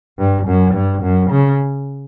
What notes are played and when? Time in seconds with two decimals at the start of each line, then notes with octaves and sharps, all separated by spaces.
0.19 G2
0.47 F#2
0.75 G2
1.03 F#2
1.31 C#3